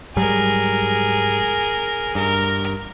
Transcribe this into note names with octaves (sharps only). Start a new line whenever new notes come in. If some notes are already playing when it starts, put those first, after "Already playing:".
G#2 F#3 G3 G#4 A#4
G2 A#4